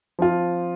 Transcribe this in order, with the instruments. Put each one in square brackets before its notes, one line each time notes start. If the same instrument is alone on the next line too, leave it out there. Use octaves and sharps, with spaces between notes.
[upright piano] F3 C4 F4